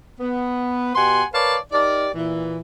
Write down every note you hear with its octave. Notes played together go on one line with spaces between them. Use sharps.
B3
B2 G4 F#5 G#5 C6
A#4 B4 C#5 D5 F5 A5
D#4 G4 A#4 D5
A#2 E3